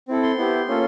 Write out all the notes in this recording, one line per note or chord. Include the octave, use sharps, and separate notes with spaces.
C4 E4 A4
C6
B3 E4 G4
A#3 C#4 F4 A4